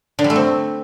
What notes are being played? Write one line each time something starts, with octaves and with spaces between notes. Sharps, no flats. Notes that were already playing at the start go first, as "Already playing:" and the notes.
D3
G3
A3
C4